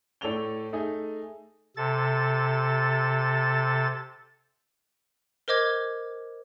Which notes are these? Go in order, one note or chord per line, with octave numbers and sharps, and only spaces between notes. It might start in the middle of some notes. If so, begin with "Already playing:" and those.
A2 A4 C#5 D5 F7 G7
A3 D#4 G#4
C3 A4 A6
A#4 C5 D#5 D6 G#6